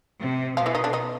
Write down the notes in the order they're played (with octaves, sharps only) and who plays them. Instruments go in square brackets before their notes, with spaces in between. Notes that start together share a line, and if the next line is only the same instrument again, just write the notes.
[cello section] C3
[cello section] B2 [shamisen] F3 F4
[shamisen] E3 E4
D#3 D#4
D3 D4
D#3 D#4